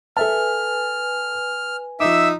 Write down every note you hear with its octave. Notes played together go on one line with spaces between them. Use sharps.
A4 B4 E5 G#5 A5 F6
F3 D#4 E5 D6 E6